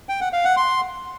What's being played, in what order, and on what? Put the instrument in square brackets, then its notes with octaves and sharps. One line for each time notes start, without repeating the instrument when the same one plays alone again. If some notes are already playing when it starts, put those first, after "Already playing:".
[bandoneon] G5
F#5
F5
F#5
C6